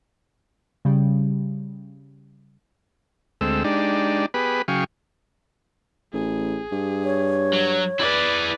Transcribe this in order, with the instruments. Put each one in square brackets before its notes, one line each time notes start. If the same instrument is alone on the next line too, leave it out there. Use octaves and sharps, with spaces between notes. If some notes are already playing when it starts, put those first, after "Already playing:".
[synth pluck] C#3 G3
[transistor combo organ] D2 G#3 C4 A4 E6
G#3 D4 D#4 G4 D5
B3 G4 G#4 B4 B5
C#3 F#3 G#4 F5 G5 C#6
[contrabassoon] A1 [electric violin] G#4
[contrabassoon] G2
[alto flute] C#5
[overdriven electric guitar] F#3
[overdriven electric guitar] E4 G#4 [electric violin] B4 D5